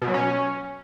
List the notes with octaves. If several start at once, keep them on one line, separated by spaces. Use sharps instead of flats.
B2
F#3
C#4